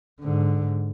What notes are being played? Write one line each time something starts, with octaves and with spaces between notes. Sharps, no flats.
G#2 D3